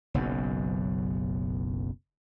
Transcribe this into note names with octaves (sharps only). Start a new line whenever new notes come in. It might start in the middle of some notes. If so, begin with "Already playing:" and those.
F#1 B1 F#2